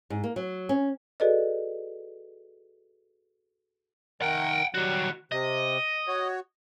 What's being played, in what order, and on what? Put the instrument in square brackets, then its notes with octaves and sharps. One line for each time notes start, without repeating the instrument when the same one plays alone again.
[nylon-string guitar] G#2
A#3
F#3
C#4
[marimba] F#4 G#4 A4 B4 D5 D#5
[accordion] D#3 A#4 [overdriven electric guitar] F#5 G5
[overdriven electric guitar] D#3 F#4 [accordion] F#3 G3
[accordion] C3 [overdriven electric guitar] D#5
[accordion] F#4 C#5